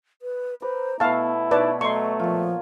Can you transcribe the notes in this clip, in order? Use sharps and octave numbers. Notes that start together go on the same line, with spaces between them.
B4
B4 C5 A#5 D6
B2 A3 B3 E4 F5 A5
B2 D#4 B4 C#5 D5 E5 A5
F#3 A3 C#5 D#5 C6 C#6
A#2 F3 F4